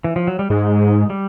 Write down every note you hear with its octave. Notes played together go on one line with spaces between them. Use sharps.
E3
F3
F#3
G3
G#2 G#3
G3